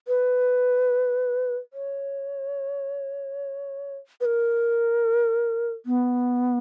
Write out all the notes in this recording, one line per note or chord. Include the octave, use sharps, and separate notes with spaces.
B4
C#5
B4
A#4
B3